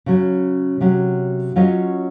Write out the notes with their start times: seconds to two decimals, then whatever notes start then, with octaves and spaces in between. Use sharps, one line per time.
0.06 C#3 F#3 C#4
0.81 C3 F#3 C#4
1.56 F#3 C#4 F4 C5 D#5